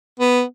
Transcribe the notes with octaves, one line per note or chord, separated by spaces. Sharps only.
B3